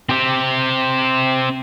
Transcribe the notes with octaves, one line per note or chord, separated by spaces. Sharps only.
C4 G4